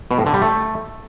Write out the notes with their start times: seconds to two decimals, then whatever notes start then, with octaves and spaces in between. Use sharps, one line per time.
0.11 B2
0.18 A2
0.26 D3
0.34 G3
0.42 A3